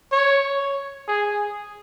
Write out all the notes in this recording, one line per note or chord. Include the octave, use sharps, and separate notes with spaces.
C#5
G#4